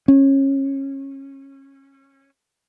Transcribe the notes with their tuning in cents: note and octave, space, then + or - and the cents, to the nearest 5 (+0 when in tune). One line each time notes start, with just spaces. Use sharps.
C#4 -25